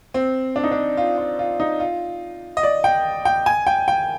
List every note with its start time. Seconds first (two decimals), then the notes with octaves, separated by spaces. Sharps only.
0.14 C4
0.56 D4
0.64 D#4
0.72 D4
0.97 F4
1.18 F4
1.39 F4
1.60 D#4
1.80 F4
2.57 D#5
2.63 D5
2.84 G5
3.25 G5
3.46 G#5
3.67 G5
3.88 G5